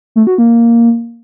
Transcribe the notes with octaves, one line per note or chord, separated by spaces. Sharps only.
A3
F#4
A#3